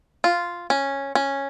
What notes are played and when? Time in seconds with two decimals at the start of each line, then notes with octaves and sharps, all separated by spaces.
0.24 F4
0.70 C#4
1.15 C#4